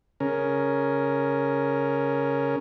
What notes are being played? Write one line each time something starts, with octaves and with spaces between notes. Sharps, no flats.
C#3 C#4 A#4